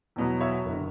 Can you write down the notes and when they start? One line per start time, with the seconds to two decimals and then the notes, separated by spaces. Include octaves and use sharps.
0.16 E2 B2 F#3
0.41 C#5 E5
0.66 F#1 D3